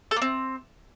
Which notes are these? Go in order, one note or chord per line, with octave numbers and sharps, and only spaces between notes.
A4
A#3
C4